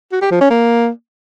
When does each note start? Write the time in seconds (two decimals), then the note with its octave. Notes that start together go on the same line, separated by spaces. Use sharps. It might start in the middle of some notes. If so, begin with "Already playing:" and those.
0.12 F#4
0.22 G4
0.31 F3
0.41 C#4
0.50 A#3